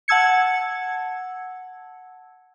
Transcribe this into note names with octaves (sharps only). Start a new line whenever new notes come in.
F#5 A5 E6 G#6 C#7